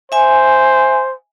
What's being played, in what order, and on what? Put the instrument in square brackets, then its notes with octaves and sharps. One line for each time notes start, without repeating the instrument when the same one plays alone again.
[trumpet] C5 [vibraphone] E5 G#5